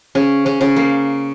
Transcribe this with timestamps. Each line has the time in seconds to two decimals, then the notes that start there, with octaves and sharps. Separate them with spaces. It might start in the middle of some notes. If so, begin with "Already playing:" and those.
0.15 C#3 C#4
0.46 C#3 C#4
0.61 C#3 C#4
0.76 A#3